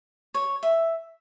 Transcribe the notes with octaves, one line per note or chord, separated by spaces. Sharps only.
C#5
E5